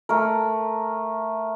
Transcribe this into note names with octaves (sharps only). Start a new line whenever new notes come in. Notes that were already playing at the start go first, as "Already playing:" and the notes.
A3 A#4